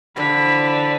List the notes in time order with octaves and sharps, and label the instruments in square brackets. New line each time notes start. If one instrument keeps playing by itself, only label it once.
[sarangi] D3 [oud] E3 F3 D4 [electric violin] B5 B6